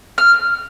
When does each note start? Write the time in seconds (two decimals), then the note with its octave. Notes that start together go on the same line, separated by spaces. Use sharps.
0.18 F6